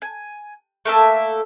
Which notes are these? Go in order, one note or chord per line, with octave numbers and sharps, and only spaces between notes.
G#5
A3 A#3 A4 E5